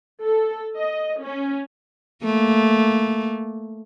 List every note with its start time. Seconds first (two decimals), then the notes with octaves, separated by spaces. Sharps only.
0.23 A4
0.76 D#5
1.22 C#4
2.23 A3 A#3